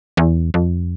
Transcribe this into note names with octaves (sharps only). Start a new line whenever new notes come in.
E2
F2